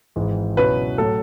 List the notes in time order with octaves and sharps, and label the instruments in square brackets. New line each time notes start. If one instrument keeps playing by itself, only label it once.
[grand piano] G#1 G#2 E3 G#3
[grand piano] C#2 B2 F#3 C#4 E4 [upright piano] B4
[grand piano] A2 F#3 A3 [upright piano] A4